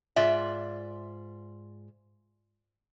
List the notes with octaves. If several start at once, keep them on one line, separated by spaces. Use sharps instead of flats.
G#2 F4 D5 E5